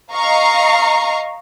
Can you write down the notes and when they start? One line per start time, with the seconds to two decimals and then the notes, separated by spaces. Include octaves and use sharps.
0.12 D#5 F5 A#5 C#6 C7